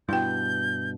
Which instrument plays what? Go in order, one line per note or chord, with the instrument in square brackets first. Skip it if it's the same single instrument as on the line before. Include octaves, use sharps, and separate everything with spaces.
[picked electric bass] G2 B2 [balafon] E4 G5 [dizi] G6